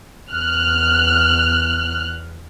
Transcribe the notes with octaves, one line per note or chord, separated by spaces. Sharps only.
E2 F6 F#6